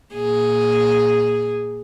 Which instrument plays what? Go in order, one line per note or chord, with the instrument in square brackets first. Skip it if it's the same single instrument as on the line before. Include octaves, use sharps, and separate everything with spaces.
[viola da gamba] A#2 G#4